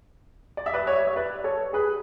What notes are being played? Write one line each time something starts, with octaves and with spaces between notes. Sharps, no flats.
D5
E5
B4 D5
C#5 E5
E5
B4 D5
A4 C#5
G#4 B4